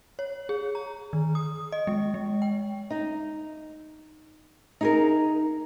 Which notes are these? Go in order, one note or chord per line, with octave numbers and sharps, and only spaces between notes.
C#5
G#4
A#5
D#3
D#6
D#5
G#3
G#3
G5
D#4
D#4 G#4 A#4